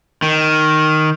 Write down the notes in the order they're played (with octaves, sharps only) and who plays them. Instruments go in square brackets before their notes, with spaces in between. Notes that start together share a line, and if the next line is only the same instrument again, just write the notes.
[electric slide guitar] D#3